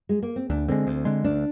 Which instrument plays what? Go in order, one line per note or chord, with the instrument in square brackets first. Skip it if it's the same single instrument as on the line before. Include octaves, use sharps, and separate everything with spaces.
[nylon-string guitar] G#3
A#3
C4
[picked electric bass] D2 [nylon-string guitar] D4
[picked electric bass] D3 G#3 [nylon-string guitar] C4
[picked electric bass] D2
D3 G#3
[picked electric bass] D2 [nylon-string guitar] D4